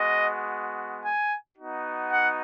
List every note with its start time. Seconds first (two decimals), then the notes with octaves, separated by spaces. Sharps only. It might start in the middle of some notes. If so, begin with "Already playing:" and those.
Already playing: G#3 B3 F#4 D#5
1.03 G#5
1.57 B3 D#4 F#4
2.11 F#5